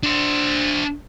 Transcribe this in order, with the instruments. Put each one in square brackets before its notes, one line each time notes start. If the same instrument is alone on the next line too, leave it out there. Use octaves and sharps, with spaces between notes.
[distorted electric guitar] D4 C5